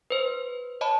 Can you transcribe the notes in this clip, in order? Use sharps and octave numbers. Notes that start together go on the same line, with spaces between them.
B4 C5
C#5 D#5 A5 B5